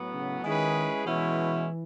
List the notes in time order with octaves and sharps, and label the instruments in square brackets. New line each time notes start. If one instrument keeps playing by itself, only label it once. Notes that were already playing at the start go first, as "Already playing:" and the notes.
Already playing: [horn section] A2 F#3 B3
[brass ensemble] C#3
[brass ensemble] D#3 [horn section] G#3 C#4 E4 G#4 B4
[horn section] B2 G#3 C#4 E4 [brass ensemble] E3